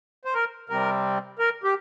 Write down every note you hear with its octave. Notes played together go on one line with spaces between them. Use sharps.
C5
A#4
C3 G3 C4 A#4
A#4
G4